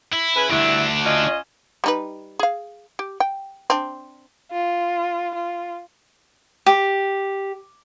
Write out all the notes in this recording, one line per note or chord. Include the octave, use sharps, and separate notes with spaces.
E4
C#3 B4
D2 G2 D4 E4
C#4 F4 D#5
G3 D#4 B4
G#4 F5
G4
G5
C4 D4
F4
F4
G4